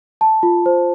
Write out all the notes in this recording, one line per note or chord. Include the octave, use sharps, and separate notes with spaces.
A5
F4
C5